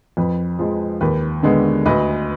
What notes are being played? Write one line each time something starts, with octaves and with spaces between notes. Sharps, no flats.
F2 B4
F3 G#3
D#2 B4
D3 G#3 B3
D2 B4 D#5